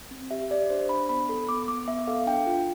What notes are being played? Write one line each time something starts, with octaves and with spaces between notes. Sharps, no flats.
C4
G4 E5
G4 D5
D4 C5
D4 B5
B3 B5
A4
B3 D6
B3 D6
B3 E5
A4 F5
D4 G5
F4